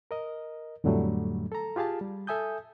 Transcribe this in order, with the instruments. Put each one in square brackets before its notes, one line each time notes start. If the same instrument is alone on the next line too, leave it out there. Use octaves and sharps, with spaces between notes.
[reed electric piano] A#4 D#5
F2 A2 D3 F#3 G3 A3
A4 A#5
F4 G4 G#4 F5 A5
G3
A4 E5 G#5 D#6 G6